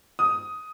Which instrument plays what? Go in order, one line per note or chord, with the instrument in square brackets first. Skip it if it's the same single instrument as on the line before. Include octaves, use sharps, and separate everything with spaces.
[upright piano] D#6